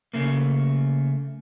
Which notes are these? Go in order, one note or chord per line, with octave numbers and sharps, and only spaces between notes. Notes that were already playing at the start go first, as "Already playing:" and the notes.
C#3 A3 A#3